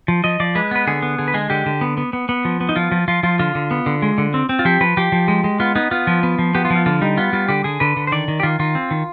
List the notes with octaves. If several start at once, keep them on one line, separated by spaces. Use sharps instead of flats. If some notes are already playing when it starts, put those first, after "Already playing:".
F3
F3 D#5
F3 D5
G#3 B4
B3 B4
D3 G#4
B3
D3 G#4
B4
G#3 G#4
D3 G4
D3
B3
B3
B3
B3
F3
B3
D#4
F3 F4
F3
F3 F4
F3 F4
D3 F4
D3
B3
D3
G#3
D3
C4
C4
F4
F3 G4
F3 B4
F3 G4
F3
G#3
G#3
B3 F4
B3 D#4
B3 F4
F3
B3
F3
B3 G4
F4
F3
F4
D3 F4
G3 D#4
B3 F4
G3 F4
D3 G4
D3 G#4
D3 B4
D3
C5
D#3 D5
D#3
G4
D#3 F4
D#3 F4
C4
D#3